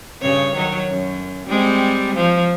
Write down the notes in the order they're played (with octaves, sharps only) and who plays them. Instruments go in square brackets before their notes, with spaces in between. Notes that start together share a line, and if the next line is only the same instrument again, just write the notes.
[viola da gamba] G2 C#3 C#5
D#3 F#3 C#5
F#2
G3 G#3 C4
F3